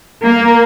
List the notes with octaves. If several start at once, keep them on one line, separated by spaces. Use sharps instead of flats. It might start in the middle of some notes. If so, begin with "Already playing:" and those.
A#3